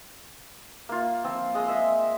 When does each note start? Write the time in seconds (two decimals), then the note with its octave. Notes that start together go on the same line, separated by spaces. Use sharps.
0.89 A#3 F4
1.24 F3 C4
1.55 G#3 D#5
1.68 D#5 E5